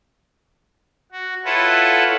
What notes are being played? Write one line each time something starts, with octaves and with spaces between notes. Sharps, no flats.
F#4
E4 F4 A4 B4 C#5 F#5